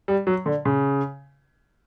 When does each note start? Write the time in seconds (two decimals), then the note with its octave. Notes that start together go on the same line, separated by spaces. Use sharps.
0.08 G3
0.27 F#3
0.46 D3
0.65 C#3